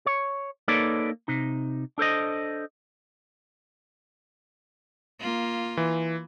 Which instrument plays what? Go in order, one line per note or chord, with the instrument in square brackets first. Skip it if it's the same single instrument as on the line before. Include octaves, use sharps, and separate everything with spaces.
[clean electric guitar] C#5
A#3 D#4 A4 B4 C#5 D5
C3 D#4
D4 A4 C5 D#5
[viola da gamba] A#3 F4
[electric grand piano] E3